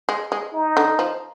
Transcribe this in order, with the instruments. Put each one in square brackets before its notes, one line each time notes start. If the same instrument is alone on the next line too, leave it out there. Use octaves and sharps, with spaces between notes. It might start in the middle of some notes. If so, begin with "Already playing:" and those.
[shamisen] G#3
G#3
[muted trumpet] D#4
[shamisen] D3
F3